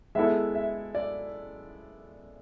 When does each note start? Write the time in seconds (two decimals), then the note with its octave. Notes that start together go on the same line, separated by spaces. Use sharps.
0.15 G#3 B3 E4 A4 E5
0.55 E5
0.95 D5